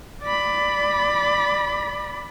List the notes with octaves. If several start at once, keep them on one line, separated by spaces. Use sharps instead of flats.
D5 B5